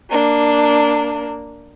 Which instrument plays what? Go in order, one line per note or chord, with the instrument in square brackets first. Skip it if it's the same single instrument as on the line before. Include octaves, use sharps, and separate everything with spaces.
[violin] A#3 D4